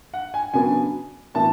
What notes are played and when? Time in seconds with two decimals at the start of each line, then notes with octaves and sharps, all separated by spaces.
0.14 F#5
0.34 G#5
0.54 C#3 F#3 B3 D4 G#5
1.34 A2 E3 B3 D4 A5